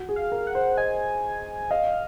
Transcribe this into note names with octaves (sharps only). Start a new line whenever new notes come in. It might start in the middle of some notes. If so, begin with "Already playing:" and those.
Already playing: F#4
G#4
F5
A#4
F#5
C5
D#5 G#5
D#5 F5